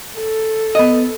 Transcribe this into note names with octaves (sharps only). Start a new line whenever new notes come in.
A4
B3 D#5